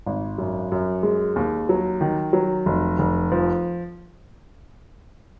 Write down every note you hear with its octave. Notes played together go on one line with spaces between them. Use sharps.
G#1
F#2
F#2
G#3
D#2
F#3
D#3
F#3
F1
F1
F3